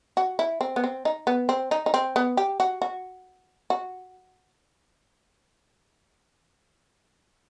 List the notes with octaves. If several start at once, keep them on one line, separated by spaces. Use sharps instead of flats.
F#4
E4
C4
B3
C4
D#4
B3
C4
D#4
D#4
C4
B3
G4
F#4
F#4
F#4